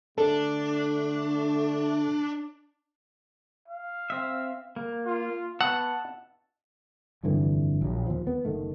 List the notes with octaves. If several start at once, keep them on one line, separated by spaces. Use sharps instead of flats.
D3 A3 D4 A4
F5
C4 E5
A#3
F4
B3 F#5 A5 C#6 E6
F1 G2 D3 E3
A#1 F#3
D#2 F3
B3
F#1 D#3 A3